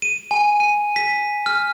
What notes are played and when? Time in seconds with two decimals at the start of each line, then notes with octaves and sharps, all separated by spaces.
0.02 D#7
0.31 G#5
0.60 D#7
0.96 B6
1.46 F6